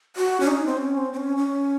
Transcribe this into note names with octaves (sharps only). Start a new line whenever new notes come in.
F#4
C#4
D#4
C4
C#4
C4
C4
C#4
C#4